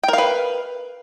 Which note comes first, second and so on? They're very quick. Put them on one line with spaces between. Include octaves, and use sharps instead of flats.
G5 A#4 F5 B4